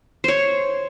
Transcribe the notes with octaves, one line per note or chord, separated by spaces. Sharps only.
C5 C#5